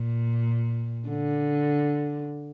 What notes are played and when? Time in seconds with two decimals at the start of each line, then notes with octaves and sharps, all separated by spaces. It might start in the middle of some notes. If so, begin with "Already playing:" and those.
Already playing: A#2
1.08 D3